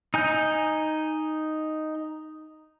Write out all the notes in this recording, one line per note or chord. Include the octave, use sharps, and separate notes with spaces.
D#4 G#5 G6